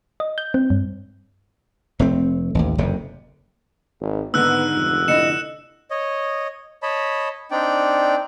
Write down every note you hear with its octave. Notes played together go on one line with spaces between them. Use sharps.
D#5
G6
C4
G2
F1 A3 C4
A1 D#2
F#1 F2 C3
G#1
G#2 D3 D#3 B3 E6 F#6
F1
D3 E4 D#5 C#7 E7
C#5 D#5
C#5 D#5 A5 B5
C4 D4 D#4 D5 G5